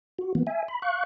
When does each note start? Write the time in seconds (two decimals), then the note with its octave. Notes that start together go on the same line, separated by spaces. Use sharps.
0.19 F#4
0.35 E3 A#3 B3
0.47 E5 G#5
0.68 B5
0.82 F5 C#6 F#6